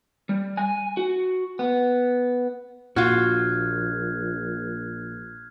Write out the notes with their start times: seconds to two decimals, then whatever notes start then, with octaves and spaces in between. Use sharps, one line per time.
0.29 G3
0.57 G#5
0.97 F#4
1.59 B3
2.96 A#1 A#2 F4 F#4 F6 F#6 G#6